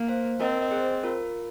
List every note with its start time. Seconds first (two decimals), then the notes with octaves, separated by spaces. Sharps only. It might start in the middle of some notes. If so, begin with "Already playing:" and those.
Already playing: A#3
0.08 C5 F5
0.40 C4 A#4 D#5
0.62 D#5
0.71 G#4 C5
1.04 F4 A#4